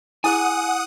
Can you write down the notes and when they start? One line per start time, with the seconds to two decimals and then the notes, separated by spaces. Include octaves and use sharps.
0.24 E4 G#4 F#5 G#5 D#6